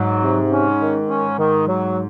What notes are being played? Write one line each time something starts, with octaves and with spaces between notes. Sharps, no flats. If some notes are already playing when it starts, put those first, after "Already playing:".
Already playing: G#2 F#3
C3
C#4
D#3
C#4
D#3
F#3